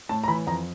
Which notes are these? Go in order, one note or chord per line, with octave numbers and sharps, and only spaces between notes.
A2 A5
A#5
E3 B5
F2 A#5